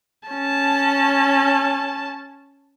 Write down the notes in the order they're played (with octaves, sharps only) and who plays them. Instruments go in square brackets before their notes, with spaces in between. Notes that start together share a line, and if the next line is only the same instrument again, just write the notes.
[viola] C#4 A5